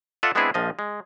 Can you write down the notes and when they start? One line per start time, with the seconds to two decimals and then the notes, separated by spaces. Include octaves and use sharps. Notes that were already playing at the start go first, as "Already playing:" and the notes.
0.23 F4 A4 D5 E5 F#5
0.35 G#3 B3 C4 D4 E4 G#4
0.54 A#1 F3 D#5
0.79 G#3